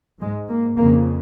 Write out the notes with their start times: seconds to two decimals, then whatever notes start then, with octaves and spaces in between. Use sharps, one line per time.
0.20 G#2 G#3
0.49 A#3
0.77 F2 C#3 A#3